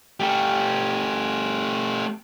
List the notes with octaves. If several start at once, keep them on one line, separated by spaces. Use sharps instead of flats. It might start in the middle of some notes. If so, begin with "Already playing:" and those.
A3 G4